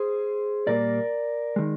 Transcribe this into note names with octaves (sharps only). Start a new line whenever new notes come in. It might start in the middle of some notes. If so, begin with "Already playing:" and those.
Already playing: G#4 C5
A#2 G3 A#3 A#4 D5
D#3 G#3